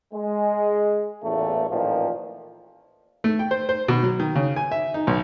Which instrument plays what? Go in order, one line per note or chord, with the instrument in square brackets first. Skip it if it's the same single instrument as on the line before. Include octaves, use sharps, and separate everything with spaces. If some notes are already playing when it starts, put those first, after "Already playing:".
[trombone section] G#3
A1 E2 A#2 A3
A1 A#2 D#3 F3
[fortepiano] A3
G5
C5
C5
B2
F#3
D#3
C#3
G#5
E5
D#4
B1